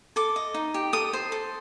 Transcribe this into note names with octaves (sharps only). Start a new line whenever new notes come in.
A4 D6
D#5
D#4
G4
A4 D#6
C5
A4